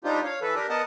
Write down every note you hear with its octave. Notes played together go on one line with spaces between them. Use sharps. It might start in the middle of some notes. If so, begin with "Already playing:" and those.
G3 D4 D#4 F4 G4 C5
C#5 F5
E3 A4 B4
D4 G4 A#4
B3 A#4 D#5 F#5 A5